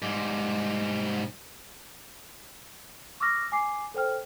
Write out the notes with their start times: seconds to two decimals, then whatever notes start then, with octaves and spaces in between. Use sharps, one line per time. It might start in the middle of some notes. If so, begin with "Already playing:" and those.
0.02 G#2 G3
3.20 C#6 D6 E6 F6 A#6
3.52 G#5 D6 C7
3.94 A4 C5 G5 F6